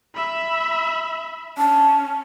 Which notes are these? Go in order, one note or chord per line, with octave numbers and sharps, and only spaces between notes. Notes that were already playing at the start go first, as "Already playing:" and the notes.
E5 B5
C#4 A5